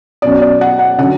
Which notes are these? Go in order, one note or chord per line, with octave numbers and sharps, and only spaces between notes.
B2 F#3 C#4 D5
D5
F#5
F#5
D3 F#3 C#4 F#5